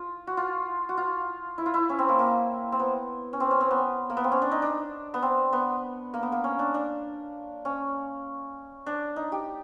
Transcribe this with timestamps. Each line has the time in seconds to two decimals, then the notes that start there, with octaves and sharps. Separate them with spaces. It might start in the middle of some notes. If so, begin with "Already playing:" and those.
Already playing: F4
0.27 F#4
0.37 F4
0.89 F#4
0.97 F4
1.58 E4
1.66 F4
1.74 E4
1.89 C#4
1.99 C4
2.09 A#3
2.19 A#3
2.72 C4
2.80 B3
3.33 C#4
3.40 C4
3.51 C#4
3.61 C4
3.71 B3
4.10 A#3
4.17 B3
4.24 C4
4.32 C#4
4.42 D4
4.51 D#4
4.62 D4
5.14 B3
5.22 C4
5.53 B3
6.14 A#3
6.23 B3
6.32 A#3
6.44 C#4
6.59 D4
6.74 D4
7.65 C#4
8.86 D4
9.16 D#4
9.32 G4